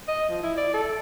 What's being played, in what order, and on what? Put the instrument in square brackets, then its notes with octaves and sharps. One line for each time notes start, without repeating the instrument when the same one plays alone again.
[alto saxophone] D#5
F3
E4
D5
A4